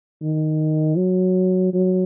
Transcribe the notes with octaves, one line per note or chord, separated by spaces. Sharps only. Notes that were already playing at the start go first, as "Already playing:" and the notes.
D#3
F#3
F#3